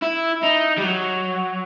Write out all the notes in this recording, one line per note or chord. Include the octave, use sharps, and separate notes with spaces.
E4
D#4
G3
F#3